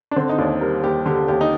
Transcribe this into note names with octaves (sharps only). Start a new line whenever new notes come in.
D4
D3 C4
D#4
D#2 D4
G3 A#4
D#2 G4
D3 G4
D#2 G4
D#4